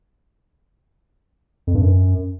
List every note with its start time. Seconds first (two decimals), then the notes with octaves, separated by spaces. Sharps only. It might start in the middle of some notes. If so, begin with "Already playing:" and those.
1.67 F2
1.75 G2
1.82 F#2